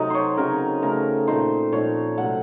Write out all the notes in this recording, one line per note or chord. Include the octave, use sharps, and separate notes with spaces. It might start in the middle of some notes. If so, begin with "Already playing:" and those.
Already playing: C3 F#3 A3 C4 D#4 D#5
C5 C#5
C#3 F#3 C4 D#4 A#4
C#3 A3 C4 A#4
A#2 A3 C4 D#4 C5
A#2 F3 C4 D#4 C#5
C3 F#3 A3 F#5